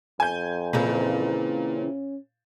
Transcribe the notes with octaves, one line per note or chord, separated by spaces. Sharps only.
F2 G#5 G6
A#2 C#3 E3 C4
C#4